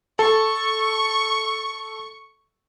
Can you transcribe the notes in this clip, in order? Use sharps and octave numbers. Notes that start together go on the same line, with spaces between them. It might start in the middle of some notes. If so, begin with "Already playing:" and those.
A4 C#6